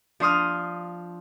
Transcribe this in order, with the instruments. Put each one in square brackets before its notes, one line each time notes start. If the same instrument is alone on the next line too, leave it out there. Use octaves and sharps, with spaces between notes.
[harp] F3 D4 C6 D#6 F6